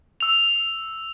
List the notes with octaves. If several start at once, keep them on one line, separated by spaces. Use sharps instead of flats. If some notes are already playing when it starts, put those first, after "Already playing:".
E6 F7